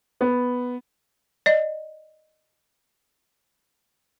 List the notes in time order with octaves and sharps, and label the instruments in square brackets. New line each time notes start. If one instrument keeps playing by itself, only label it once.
[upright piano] B3
[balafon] D5 D#5